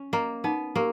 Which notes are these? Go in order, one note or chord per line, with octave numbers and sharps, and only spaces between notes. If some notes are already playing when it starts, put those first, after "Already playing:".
Already playing: C#4
A#3 D#5 A#5
B3 D#4
A#3 G4 A#4